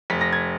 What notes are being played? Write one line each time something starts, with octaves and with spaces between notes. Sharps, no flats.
F1 B6
A#6
G#6